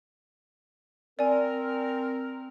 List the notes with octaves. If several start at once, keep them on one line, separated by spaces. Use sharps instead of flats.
C4 A#4 D5 G#5